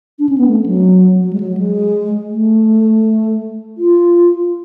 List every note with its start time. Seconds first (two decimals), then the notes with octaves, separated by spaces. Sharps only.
0.19 D4
0.29 C#4
0.38 B3
0.48 A3
0.66 F#3
1.22 F#3
1.33 G#3
1.40 F#3
1.57 G#3
2.31 A3
3.78 F4